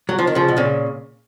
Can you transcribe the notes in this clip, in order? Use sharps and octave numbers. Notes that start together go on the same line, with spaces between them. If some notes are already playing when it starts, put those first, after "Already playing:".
F#3
F3
D#3
C#3 F3
B2
A#2 C#3